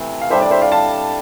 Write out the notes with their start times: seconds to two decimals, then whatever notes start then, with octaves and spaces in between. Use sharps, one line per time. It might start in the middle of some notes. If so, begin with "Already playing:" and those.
Already playing: C3 E3 A3
0.21 F5
0.30 A2 G3 D4 C5 E5
0.41 D5
0.51 C5 E5
0.61 D5 F5
0.72 F5 A5